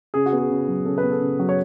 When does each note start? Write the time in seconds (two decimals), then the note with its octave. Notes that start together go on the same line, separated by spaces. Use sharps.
0.14 C#3 G#4
0.26 F#4
0.33 B3
0.38 G#4
0.50 C#3
0.68 F#3
0.85 C#3 A4
0.98 B4
1.03 B3
1.11 A4
1.21 C#3
1.39 F#3
1.49 C#5